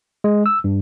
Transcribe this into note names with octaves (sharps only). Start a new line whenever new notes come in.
G#3
E6
G2